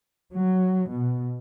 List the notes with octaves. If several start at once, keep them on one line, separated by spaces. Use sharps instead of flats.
F#3
B2